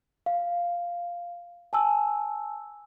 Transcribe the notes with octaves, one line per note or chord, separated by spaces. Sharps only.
F5
G#5 A5 E6